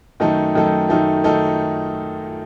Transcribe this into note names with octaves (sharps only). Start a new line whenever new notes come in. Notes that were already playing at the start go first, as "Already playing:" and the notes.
F#2 D#3 A3 D#4 A4
F#2 D#3 A3 D#4 A4
F#2 D#3 A3 D#4 A4
D#3 A3 D#4 A4